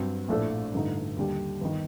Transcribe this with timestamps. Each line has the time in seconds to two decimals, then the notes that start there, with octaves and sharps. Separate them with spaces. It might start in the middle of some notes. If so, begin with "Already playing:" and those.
Already playing: G2 F#3 C4
0.28 A#1 A2 A3 D4 A4
0.73 A1 G2 D3 A3 D#4
1.17 D#2 D3 G3 D4 G4
1.61 G1 D#3